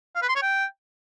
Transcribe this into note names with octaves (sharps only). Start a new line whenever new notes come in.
F5
B4
C6
C#5
G5